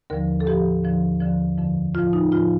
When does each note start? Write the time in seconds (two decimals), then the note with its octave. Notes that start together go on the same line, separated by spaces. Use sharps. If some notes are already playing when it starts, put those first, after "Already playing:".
0.10 D#2 D3 F3 A#4
0.40 A4
0.47 A2 F3 G4
0.84 D#2 D3 F3
1.20 D#2 D3 F3
1.58 F2 D3 F3
1.95 A2 F3 F4
2.13 D#4
2.32 A2 F3 F4